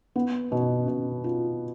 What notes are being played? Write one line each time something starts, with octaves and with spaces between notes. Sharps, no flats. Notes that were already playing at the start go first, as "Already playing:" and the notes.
B3
B2
B2
F4